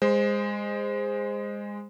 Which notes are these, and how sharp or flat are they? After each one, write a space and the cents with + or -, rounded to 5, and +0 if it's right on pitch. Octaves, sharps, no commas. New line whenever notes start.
G#3 -20 C5 +0